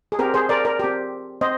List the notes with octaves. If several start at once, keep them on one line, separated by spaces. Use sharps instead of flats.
G#4
C4 G4 A#4
G#4 C5
A#4 D5
A#4 D5
C4 G4
C4 C5 D#5